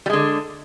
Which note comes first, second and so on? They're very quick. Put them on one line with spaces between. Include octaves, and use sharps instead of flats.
G3 G#3 D3